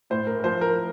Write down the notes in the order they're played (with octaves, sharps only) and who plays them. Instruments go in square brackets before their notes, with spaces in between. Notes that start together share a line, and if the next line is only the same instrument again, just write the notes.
[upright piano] A2 [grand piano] C5
[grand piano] A#4
A#4
[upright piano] F3 [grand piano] C5
[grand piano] A#4